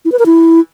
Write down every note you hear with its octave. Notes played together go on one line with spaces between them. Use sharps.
E4
B4
A#4
E4